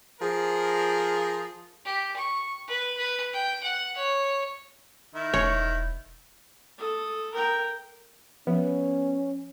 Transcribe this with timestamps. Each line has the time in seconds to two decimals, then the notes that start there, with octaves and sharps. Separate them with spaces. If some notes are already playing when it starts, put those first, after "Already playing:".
0.21 F3 G#4 A#4
1.85 G4
2.16 C#6
2.68 B4
2.97 B4
3.33 G5
3.63 F#5
3.97 C#5
5.15 D#3 E4
5.34 E1 C#5
6.78 A4 D#6
7.34 A#4 G5
8.47 F3 B3 C#4